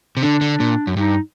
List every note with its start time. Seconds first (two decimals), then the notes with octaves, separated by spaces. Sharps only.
0.17 C3
0.22 D3 D4
0.41 D3
0.60 A#2
0.87 F#2
0.97 G2 D#4